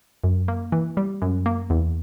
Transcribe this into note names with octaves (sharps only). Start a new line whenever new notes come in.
F#2
A#3
E3
G3
F#2
A#3
E2